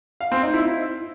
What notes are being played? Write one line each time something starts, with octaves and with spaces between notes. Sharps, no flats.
F5
C4
D#4
E4